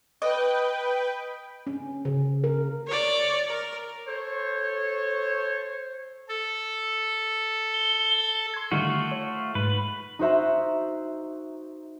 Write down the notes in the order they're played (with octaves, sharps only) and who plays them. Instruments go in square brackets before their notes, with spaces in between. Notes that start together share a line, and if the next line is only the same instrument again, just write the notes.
[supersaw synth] B4 G5 [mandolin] D#5
[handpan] C#4
C#3
A#4
[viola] C#5 D5
A#4
[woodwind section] A4 C5 C#5
[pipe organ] A4
[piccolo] G7
[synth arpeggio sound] C6 G#6
[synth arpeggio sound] D3 D#3 G3 [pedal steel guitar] A3 F4 F#4
[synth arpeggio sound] C#5
[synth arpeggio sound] G#2 [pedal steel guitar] B4
[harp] D#4 F#4 C5 E5 A#5